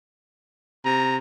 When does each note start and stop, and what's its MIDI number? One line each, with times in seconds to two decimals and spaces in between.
0.85 1.19 48
0.85 1.17 82